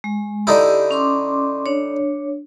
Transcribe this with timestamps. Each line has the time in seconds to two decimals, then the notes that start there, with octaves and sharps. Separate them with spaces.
0.04 G#3
0.47 D3 D#4 E4 G4 D5
0.91 C#4 C6 D6
1.66 D4 C#5